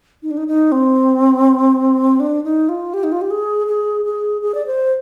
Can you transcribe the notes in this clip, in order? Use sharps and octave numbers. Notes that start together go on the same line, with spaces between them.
D#4
D4
D#4
D#4
C4
D4
D#4
F4
G4
D#4
F4
G4
G#4
G#4
G#4
G#4
D5
C5